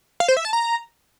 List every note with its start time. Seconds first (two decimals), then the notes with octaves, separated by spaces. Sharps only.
0.20 F5
0.28 C5
0.37 E5
0.45 A5
0.53 A#5